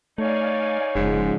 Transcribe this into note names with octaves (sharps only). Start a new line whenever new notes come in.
A3 D#4 C#5 D5 F5 G#5
F1 G#2 C#3 F3 G#3